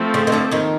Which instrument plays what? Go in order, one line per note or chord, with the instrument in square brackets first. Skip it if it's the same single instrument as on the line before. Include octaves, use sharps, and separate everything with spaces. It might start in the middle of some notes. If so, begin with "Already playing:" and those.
Already playing: [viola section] F3 A3 C4
[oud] C#3
D#3
D2 D3
D#2 D#3